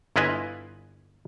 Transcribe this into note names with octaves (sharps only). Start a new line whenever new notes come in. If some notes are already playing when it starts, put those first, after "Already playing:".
G1 E4 F4 B4 D#5 G#5